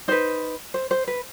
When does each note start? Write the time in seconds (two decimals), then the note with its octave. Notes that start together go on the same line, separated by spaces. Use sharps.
0.08 D#4 B4 C5
0.74 C5
0.91 C5
1.08 B4